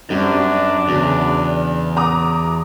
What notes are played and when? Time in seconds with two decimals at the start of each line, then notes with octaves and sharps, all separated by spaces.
0.10 F#2 G3 C4 D4
0.88 E2 C#3 F#4
1.97 A#5 D6 D#6